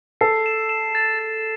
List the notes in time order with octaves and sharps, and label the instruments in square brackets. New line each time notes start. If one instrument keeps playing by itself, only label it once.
[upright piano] A4 [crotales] C7
[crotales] E7
E7
A6
A6